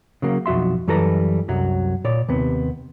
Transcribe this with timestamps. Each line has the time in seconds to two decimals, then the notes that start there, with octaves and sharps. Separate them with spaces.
0.22 C#3 F#3 A#3
0.46 B1 F2 F#4 E5 C6
0.87 F#2 E3 G3 A4 B4 A#5
1.48 C2 F#2 F#3
2.04 A#2 C#5 D5
2.28 D#2 C3 B3